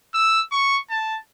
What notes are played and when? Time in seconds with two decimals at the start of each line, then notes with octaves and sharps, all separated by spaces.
0.14 E6
0.52 C#6
0.90 A5